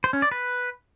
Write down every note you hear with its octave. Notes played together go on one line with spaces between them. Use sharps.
C5
C#4
D5
B4